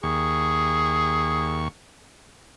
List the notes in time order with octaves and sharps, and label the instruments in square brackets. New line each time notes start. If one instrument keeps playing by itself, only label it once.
[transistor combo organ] D#2 C#6 [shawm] G#4